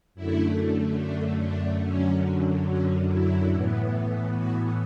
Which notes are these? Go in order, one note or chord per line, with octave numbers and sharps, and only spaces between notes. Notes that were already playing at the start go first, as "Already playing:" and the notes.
F#2 D3 A3 E4
D4
D4
F#2 D3 F#3 C#4
C#4
E4
A2 E3 B3
F#4